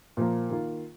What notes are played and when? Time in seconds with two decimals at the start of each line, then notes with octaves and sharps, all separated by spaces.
0.17 A#2 F3 A#3
0.50 D#3 A#3 F4